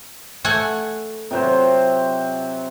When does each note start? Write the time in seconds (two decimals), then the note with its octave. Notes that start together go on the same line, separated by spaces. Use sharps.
0.45 A3 F#5 G#5
1.31 C3 F#3 C5